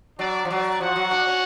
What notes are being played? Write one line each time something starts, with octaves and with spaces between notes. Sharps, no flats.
F#3 D4 D5
F3
F#3 D4 D5
F3 F#4 F#5
F#3
D4
C#4